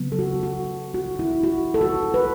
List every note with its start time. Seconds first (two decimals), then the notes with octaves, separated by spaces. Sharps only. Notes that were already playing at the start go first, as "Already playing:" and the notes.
Already playing: C#3 F#3 B3
0.12 A4
0.19 F#4
0.43 F#4
0.94 F#4
1.19 E4
1.44 F#4
1.74 A4
1.81 F#4
2.14 B4